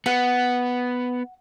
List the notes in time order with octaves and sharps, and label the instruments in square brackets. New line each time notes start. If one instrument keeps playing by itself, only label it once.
[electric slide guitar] B3 [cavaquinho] F#5